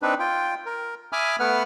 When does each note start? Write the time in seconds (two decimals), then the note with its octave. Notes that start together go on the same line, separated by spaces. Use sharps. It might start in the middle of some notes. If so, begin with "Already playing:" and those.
0.02 C4 D4 D#4 B4
0.20 F4 G5
0.66 A#4
1.13 E5 G#5 B5 D6 D#6 F6
1.40 A3 B3 B4 F#5 F6